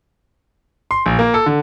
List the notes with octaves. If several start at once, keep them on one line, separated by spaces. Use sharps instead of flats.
C6
A#1
A#3
A4
D3